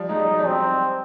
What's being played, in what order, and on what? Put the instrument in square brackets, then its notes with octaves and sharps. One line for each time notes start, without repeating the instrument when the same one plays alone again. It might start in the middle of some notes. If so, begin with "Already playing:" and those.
Already playing: [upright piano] F3 G3
[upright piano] G#3 [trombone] D#4
[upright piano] G3
F#3
F3 G3
[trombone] C4